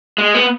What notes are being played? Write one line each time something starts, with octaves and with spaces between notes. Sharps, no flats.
G#3
B3